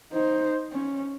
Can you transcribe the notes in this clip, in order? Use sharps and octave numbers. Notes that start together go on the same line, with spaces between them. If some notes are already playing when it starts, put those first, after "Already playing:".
D#4 C5
C#4